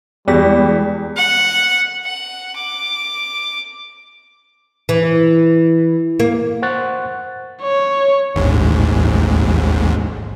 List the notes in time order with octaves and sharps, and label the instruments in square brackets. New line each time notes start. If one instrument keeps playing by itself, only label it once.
[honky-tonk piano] E2 [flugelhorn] G3 [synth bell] G#3 G#4 B6 [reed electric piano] D5
[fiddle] F#5
F#5
D6
[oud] E3
A#3
[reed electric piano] C5 F#5 C#6 F#6 A6
[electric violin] C#5
[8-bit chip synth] A1 D#2 G#2